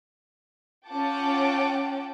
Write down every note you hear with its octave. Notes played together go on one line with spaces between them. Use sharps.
C#4 F4 F#5 G5 A5 D6